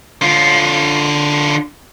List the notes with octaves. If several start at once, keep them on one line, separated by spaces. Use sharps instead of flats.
D3 F4